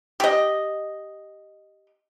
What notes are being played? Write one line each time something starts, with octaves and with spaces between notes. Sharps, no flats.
G4 D#5